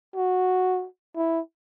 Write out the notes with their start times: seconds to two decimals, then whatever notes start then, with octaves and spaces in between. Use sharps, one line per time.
0.16 F#4
1.16 E4